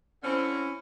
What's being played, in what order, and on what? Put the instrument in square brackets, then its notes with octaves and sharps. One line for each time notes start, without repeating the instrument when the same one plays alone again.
[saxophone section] D3 C4 [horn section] C#4 E4